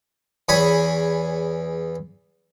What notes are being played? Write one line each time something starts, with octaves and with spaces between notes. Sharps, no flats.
E2 G#4 C#5 G#5 B5